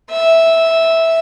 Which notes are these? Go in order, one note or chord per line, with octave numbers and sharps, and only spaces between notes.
E5